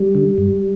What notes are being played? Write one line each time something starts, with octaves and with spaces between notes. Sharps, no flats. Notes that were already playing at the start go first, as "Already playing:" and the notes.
Already playing: G3
D3
G2